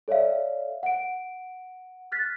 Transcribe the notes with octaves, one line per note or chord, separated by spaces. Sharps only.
A4 C#5 D5 E5 F5
F#5 D7
F6 F#6 A6 B6